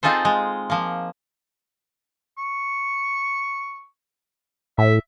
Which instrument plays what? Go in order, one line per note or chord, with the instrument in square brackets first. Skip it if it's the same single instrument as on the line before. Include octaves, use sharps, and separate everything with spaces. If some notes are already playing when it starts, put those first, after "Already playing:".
[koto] C4 D#4 F4 G#4 A4 C5
G#3
F3 A#3
[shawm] C#6
[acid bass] A2 [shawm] E5